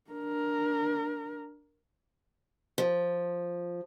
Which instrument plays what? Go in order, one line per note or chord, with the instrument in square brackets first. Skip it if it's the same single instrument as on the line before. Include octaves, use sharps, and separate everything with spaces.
[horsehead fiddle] D4 A#4
[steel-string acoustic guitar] F3